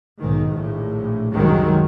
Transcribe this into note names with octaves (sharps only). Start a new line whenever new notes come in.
B1 G#2 D#3
A#1 A2
C2 F#2 D#3 F#3 G#3